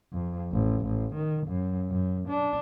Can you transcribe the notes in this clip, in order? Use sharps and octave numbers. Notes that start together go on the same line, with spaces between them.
F2
A1
A1
D#3
F#2
F#2
D4